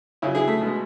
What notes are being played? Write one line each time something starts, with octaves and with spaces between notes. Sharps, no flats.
C#3 F#3 C#4 E4
E4 G#4
A3
B2 G#3